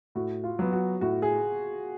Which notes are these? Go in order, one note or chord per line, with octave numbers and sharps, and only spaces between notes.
A2 F#4
F4
F#3 B3
F#4
A2 F#4
G#4